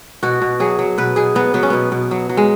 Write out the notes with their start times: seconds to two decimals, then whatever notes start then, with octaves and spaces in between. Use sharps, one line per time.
0.23 B2 F#4
0.42 B2
0.60 F#3 G#4
0.79 F#3
0.98 B2 B4
1.16 B2 G#4
1.35 F#3 B3
1.54 F#3 B3
1.63 C#4
1.70 B2 B3
1.92 B2
2.11 F#3
2.29 F#3
2.37 G#3